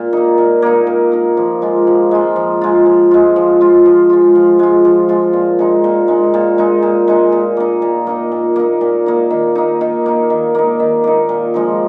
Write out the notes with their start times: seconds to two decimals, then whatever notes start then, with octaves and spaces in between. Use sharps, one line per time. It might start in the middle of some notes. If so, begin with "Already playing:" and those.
Already playing: A#2
0.13 A#3 D#4
0.38 A#2
0.62 A#3 D#4
0.87 A#2
1.12 A#3 D#4
1.37 F3
1.62 G#3 F4
1.87 F3
2.11 G#3 F4
2.36 F3
2.61 G#3 F4
2.86 F3
3.11 G#3 F4
3.36 F3
3.61 G#3 F4
3.86 F3
4.10 G#3 F4
4.35 F3
4.59 G#3 F4
4.85 F3
5.09 G#3 F4
5.33 A#2
5.59 G#3 D#4
5.84 A#2
6.08 G#3 D#4
6.34 A#2
6.58 G#3 D#4
6.82 A#2
7.08 G#3 D#4
7.32 A#2
7.57 A#3 D#4
7.82 A#2
8.07 A#3 D#4
8.32 A#2
8.56 A#3 D#4
8.81 A#2
9.06 A#3 D#4
9.30 D#3
9.55 A#3 D#4
9.81 D#3
10.06 A#3 D#4
10.30 D#3
10.55 A#3 D#4
10.80 D#3
11.04 A#3 D#4
11.29 A#2
11.54 F3 G#3 D#4